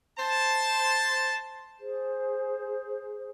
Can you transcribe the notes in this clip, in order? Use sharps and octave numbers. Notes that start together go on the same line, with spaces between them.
C5 A5
G#4 C5